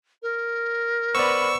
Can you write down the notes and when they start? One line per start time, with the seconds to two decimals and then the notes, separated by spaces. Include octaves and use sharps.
0.22 A#4
1.15 B3 C5 D5 B5 C#6 E6